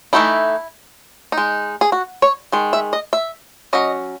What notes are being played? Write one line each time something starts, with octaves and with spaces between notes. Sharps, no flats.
E3 A3 D#4 E4
D#4
G#3
G#4
F#4
C#5
D#3 G#3
E5
D#5
E5
F#3 C#4 D#5